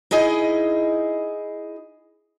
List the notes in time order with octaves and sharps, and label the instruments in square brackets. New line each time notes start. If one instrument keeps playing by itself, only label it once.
[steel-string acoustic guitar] D#4 E4 G#4 D#5